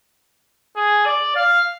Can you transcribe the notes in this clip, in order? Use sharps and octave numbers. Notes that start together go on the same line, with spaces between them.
G#4
D5
F5